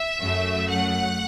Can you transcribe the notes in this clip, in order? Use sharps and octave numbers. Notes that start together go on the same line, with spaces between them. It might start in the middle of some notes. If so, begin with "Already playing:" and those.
Already playing: E5
F#2 F#3 A3
F#5